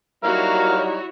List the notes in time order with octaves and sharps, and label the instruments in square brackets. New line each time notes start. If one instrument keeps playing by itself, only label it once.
[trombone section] F#3 G3 D#4 [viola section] E4 F#4 C#5 [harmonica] A#4 F5